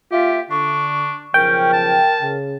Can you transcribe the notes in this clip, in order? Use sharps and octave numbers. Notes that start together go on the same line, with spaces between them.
A#3 F4 G4 E5
D3 D4 C#6
B1 C#3 F3 C#4 A#4 G5
A5
C#3